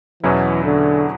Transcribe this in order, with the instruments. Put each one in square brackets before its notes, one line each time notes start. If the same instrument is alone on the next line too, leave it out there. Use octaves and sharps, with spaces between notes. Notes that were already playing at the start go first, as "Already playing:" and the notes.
[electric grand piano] E2 B2 F#3 C#4 E4 [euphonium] E3
[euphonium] D3